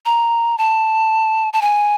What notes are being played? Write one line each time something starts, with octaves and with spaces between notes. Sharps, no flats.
A#5
A5
A5
G#5